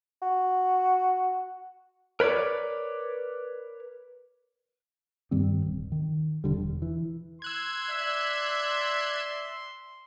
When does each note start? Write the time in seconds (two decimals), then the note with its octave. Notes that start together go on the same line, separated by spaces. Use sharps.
0.22 F#4
2.20 A#4 B4 C#5 D5
5.31 G2 D#3 G3 C4
5.66 D1
5.92 D#3
6.44 E1 D3 G3
6.58 E1
6.82 E3
7.42 C6 E6 F#6 G#6
7.90 D5 E5